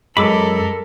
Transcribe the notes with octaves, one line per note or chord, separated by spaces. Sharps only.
F#2 G#3 A4 A#4 B5 D6 E6